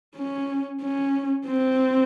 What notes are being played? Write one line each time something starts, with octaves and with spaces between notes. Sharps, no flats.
C#4
C#4
C4